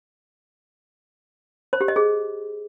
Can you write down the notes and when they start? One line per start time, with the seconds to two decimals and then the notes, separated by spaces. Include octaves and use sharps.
1.73 C5
1.81 G4
1.88 D#5
1.96 G#4